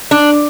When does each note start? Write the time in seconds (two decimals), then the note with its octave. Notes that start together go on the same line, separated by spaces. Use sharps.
0.11 D4